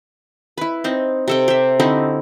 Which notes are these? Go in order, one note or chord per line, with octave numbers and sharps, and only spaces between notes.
E4 B4
C4 D#4
C3 A4 G5
G4 E5
D3 C4 D#4 E4